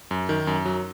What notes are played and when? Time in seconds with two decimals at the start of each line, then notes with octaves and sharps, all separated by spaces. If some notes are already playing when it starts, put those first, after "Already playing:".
0.11 F#2
0.29 D#3
0.47 F#2
0.65 F#3